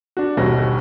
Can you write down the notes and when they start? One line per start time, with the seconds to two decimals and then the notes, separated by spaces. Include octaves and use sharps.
0.17 D4 F#4
0.37 D#1 G#1 B2 D3 C#5 A#6